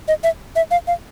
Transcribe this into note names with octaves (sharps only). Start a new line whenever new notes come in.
D#5
E5
E5
F5
F5